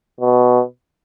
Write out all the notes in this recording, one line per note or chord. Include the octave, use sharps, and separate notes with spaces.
B2